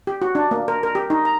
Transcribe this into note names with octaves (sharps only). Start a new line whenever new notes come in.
G4
F#4
D4
A#3
A#4
A#4
G4
D#4
A#5